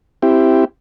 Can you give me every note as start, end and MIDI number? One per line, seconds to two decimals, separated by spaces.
0.22 0.65 60
0.22 0.65 64
0.22 0.65 67